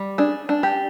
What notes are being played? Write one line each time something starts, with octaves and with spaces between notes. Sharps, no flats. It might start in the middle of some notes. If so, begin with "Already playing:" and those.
Already playing: G3
D4 G#4
D4
G4